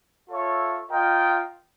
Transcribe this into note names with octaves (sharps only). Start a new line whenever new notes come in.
F4 A4 C#5 E5
F4 A#4 D#5 G5